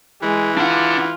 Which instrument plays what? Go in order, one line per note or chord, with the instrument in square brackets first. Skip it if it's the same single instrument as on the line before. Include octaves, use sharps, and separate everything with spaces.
[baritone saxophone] E3 [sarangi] G#3
[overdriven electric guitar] D4 F#5 [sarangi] F4